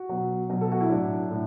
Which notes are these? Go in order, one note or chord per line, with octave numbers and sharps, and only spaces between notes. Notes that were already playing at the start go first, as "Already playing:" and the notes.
Already playing: F#4
B2 F#3
B2 F#3
A4
F#4
E4
A2 F#3 D4
A2